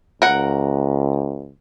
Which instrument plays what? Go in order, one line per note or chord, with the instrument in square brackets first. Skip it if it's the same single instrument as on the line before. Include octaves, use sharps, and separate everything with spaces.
[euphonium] C#2 [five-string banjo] A#4 F#5